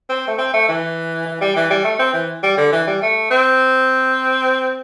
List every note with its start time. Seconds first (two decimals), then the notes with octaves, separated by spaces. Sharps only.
0.09 C4
0.27 A3
0.38 C4
0.53 A3
0.68 E3
1.26 E3
1.41 G3
1.56 E3
1.70 G3
1.84 A3
1.99 C4
2.13 E3
2.43 G3
2.57 D3
2.72 E3
2.87 G3
3.02 A3
3.30 C4